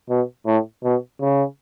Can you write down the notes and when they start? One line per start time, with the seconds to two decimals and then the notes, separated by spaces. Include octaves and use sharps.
0.10 B2
0.46 A2
0.84 B2
1.21 C#3